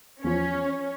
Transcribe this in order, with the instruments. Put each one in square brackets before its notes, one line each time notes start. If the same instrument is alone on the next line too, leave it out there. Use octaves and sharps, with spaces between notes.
[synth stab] E2 F3 [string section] C#4